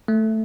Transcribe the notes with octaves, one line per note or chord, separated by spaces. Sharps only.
A3